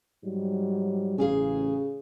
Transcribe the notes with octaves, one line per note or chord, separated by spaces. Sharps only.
G#2 F#3 G3
A1 C#3 G#4 F5 G#5